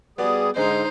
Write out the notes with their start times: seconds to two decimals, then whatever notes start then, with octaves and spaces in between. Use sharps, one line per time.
0.18 G3 B3 F#4 G#4 D5
0.56 G#2 D3 G#3 D#4 C5 D#5